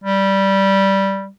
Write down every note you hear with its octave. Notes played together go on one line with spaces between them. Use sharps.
G3